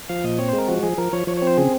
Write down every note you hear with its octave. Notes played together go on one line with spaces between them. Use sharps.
F3 F5
A#2 D#5
C4 C#5
G#3 C5
A#4
F3 F#4
F3 G#4
F3 A#4
F3 C#5
F3 C#5
C4 C#5
C5
C#3 G#4